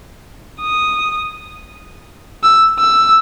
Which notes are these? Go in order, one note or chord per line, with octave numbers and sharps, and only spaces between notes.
D#6
E6
E6